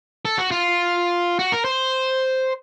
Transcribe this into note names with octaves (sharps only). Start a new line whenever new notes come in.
A4
F#4
F4
F#4
A#4
C5